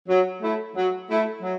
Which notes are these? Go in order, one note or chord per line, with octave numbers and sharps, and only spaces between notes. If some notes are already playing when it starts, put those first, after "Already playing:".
F#3
A3 E4
F#3
A3 E4
F#3